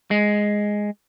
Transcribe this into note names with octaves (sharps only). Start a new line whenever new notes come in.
G#3